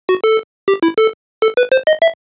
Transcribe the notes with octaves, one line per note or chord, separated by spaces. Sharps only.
F#4
A4
G4
E4
A4
A4
B4
C5
D#5
E5